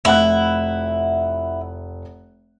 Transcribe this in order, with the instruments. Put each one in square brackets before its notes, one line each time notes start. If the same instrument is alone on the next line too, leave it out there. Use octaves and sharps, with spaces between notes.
[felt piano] F1 F#5 F#6 [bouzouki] E4